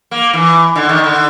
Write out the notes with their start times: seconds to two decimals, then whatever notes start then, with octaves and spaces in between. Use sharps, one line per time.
0.11 A#3
0.33 E3
0.76 D3
0.89 D#3
1.04 D3